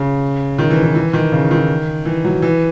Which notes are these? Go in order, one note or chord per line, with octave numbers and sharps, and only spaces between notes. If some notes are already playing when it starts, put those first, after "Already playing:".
Already playing: C#3
D#3
E3
E3
E3
D#3
C#3
D#3
E3
F#3
E3